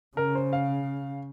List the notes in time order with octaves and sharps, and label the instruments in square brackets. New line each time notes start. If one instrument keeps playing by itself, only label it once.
[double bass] C#3 [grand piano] A#4
[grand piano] C5
F5